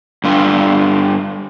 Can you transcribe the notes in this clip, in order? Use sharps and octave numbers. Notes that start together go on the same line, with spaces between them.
G2 D3 F4